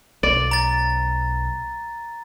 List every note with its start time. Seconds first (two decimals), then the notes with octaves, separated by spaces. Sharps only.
0.23 B1 D5
0.51 A#5 A6